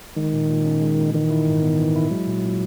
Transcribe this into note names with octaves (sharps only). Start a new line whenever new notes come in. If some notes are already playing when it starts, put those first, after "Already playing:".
D#3 G#3
A#2
A#2
C#4
G#3
A#2
D#3 E3
E4
G#2
B3
E3
E4
F#3 G#3
A#2
A#2